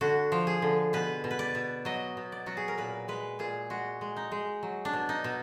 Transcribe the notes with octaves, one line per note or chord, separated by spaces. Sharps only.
D3 F#4
F3
G#4
D3
B2 B4
B2
B4
D5
B2
F#3 D#5
B2
D5
F#3 F#4
G#4
A#4
A#2 B4
G#3 B4
A#2 G#4
G#3 F#4
G#3
D#4
G#3
F#3
D4
B2
D#4
B2